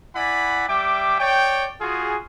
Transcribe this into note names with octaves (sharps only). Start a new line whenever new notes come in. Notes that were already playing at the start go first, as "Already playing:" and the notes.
E4 D5 F#5 G#5 B5
G3 E5 G5 D6
C#5 D5 G5
F4 F#4 G#4